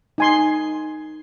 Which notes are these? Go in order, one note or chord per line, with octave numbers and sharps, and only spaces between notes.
D#4 G#5 C6